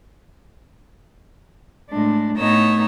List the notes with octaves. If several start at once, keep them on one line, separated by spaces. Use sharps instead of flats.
A2 G#3 D4
A2 B3 D#4 C#5 D#5 E6